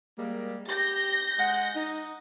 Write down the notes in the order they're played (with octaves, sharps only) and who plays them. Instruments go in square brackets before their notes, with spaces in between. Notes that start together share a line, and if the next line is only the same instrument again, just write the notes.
[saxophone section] G3 G#3 A#3
[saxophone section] G4 [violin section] G6 A#6
[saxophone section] G#3 D#5 F#5
D#4